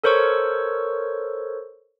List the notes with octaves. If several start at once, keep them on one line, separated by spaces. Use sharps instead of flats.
A4 A#4 C5 C#5 C#6 E6